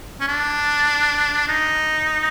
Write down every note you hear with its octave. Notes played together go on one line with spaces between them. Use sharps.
C#4
D4
D#4